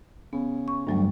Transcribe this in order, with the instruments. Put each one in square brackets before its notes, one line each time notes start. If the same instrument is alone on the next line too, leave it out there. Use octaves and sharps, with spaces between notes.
[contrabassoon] C#3 [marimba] B3
[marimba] C#6
[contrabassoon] D2 [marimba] G2 F#3 G3